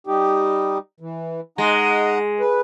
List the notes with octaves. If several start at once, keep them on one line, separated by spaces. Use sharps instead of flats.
G3 D#4 G4
E3
G#3 D#4 F#5 A#5
B4